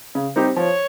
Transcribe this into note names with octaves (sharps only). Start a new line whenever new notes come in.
C#3
G3 C4 D#4 G4
F3 C#5